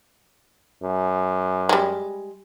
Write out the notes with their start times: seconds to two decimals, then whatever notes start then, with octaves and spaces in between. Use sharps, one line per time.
0.83 F#2
1.69 G3 G#3